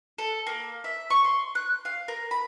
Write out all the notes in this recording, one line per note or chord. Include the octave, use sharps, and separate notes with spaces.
A4
A#3
E5
C#6
C6
F#6
F5
A#4
B5